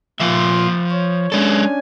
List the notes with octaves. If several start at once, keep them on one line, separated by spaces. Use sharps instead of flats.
A#2 F3 F4 E5 C6
C#5
G#3 C#4 D4 A4 G#5